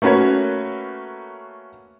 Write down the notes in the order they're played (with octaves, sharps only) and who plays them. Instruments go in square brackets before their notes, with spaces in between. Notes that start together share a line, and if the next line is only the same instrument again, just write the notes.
[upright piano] A3 A#3 C#4 F#4 B4 C#5